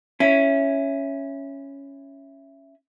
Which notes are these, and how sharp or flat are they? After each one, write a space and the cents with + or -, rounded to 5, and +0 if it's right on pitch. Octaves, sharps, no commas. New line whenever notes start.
C#4 +0 E4 +10